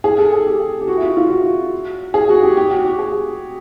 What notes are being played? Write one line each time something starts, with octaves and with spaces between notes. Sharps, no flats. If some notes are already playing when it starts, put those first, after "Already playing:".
G#4
A4
G#4
G4
G4
F#4
E4
F4
F4
F#4
G#4
F#4
G4
G4
F#4
G4
G#4